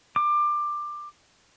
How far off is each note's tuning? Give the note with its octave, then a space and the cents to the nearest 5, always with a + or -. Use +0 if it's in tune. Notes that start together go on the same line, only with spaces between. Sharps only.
D6 +20